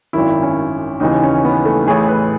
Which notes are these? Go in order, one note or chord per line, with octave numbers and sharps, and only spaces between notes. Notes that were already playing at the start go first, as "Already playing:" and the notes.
G#1 F#2 D#3 E4
C#4
D#2 C#3 E3 D#4
C#4
B3
A3
A1 A2 E3 G#4
B4